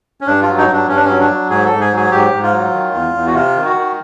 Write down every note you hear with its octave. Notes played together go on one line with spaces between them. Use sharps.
C#4
G2 D4
F4
F#3
D#4
G2
D4
G2 C#4
D4
F#3 C#4
D4
F#3
G#2 G#4
A4
G#2
G#4
F#3 G#4
G#2 G4
G#2
F4
F#3
D#3
E2
E2
F#4
C3 F4
D#3
F#4
D#3